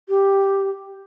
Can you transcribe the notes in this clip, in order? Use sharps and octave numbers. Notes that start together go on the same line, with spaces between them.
G4